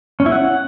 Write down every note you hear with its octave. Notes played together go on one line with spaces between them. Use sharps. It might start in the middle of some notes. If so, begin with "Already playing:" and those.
C#4
E4
F#5